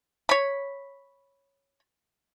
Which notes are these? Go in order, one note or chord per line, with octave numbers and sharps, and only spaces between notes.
C#5 B5